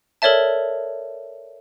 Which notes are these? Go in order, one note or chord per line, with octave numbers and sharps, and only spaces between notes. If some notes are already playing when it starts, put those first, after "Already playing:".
A4 A#4 C#5 D5 E5 A5